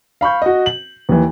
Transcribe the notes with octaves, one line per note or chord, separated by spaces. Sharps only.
F5 B5 C#6 G6
F#4 D#5
F#7
D#2 E3